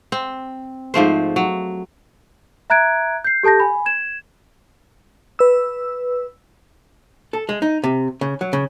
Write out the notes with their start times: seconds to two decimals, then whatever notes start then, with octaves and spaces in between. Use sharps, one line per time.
0.12 C4
0.94 G#2 F3 A3 C5
1.36 F#3
2.70 E5 A#5 F#6 G#6 D7
3.24 G6 C7
3.43 G4 A4 A5 G6 A#6
3.60 G#5 B5
3.86 G#6 E7
5.39 B4 E6
7.33 A4
7.49 G#3
7.62 D#4
7.84 C3
8.21 C#3
8.41 F#3
8.53 C#3